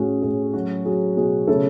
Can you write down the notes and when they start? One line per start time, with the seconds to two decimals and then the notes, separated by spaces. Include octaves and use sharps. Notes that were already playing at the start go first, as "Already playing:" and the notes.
Already playing: A2 C#4 F#4 G#4
0.22 A2 G#4
0.54 F#3 F#4
0.85 F#3 G#4
1.17 B2 G#4
1.47 C#3 A3 A4